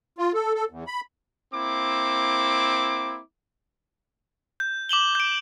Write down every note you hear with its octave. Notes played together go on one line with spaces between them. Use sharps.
F4
A4
A4
E2
B5
A#3 C4 E4 D6
G6
D6 E7 F#7 G7
G6 D7